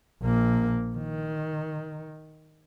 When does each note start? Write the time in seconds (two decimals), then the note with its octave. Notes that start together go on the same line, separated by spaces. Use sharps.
0.22 A#1 A#3
0.96 D#3